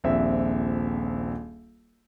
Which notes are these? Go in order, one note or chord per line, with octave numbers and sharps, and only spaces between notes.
D#1 A#1 C4 E5